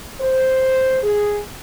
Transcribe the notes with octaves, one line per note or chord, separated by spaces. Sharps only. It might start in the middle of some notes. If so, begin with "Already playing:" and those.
C5
G#4